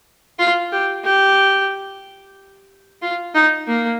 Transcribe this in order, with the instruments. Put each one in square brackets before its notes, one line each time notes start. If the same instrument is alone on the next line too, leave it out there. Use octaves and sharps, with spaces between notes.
[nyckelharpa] F4
G4
G4
F4
D#4
A#3